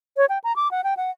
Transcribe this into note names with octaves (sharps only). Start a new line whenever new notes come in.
C#5
G5
A#5
D6
F#5
G5
F#5